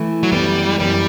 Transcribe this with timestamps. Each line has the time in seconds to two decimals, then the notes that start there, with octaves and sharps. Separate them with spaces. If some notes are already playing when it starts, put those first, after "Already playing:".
Already playing: E3 A3 E4
0.23 F#3
0.32 F#2 E3 G3 B3
0.80 F#2 E3 G3 B3